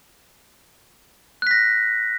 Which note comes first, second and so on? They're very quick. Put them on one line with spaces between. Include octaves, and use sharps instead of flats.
F#6 B6 A#6